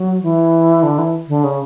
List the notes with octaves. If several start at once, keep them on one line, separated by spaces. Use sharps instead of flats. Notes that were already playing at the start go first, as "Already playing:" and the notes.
Already playing: F#3
E3
D3
E3
D3
C#3